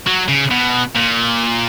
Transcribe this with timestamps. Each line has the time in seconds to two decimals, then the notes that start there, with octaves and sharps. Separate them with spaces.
0.07 F#3
0.29 C#3
0.51 B2
0.95 A#2